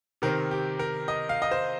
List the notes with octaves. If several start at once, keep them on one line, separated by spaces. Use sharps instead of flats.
C3 D#3 C4 A#4
G4
A#4
D#5
F5
D#5
C5